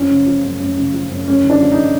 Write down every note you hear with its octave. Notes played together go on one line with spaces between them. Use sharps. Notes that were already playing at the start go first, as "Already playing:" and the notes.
Already playing: F#2 F3 C#4
C#3
F3
F#2
F#2
C#3
F3
F#2
F#2 C#4
D3
D4
F3
D#4